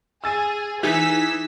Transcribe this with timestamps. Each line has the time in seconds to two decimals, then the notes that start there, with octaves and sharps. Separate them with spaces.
0.24 G#4 E6 A6 D#7
0.83 E3 D#4 G#4 E6 B6